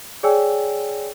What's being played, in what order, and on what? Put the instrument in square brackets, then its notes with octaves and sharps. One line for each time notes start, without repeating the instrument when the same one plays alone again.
[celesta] G#4 C#5 D5 G5 G#5 E6